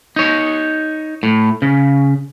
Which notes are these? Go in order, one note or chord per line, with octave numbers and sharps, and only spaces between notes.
D#4 C#5
A2
C#3